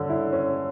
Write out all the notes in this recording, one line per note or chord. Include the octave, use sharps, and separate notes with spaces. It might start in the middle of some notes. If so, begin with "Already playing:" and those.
Already playing: D3 C#4
E4
C#4